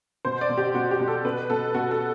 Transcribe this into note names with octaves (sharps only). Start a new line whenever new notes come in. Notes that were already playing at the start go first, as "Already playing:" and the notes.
B2 C5
D5
B2
G4
B2 F#4
G4
B2
A4
B2 B4
B2 A4
B2 F#4
A4